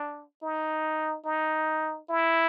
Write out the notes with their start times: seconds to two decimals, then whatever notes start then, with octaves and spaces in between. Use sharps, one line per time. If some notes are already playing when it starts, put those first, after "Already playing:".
Already playing: D4
0.42 D#4
1.25 D#4
2.09 E4